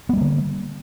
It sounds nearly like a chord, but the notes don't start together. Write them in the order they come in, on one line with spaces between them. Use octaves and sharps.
B3 G3 A#3 D3